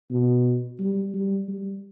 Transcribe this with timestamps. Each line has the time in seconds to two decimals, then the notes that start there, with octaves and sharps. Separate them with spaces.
0.11 B2
0.79 G3
1.14 G3
1.48 G3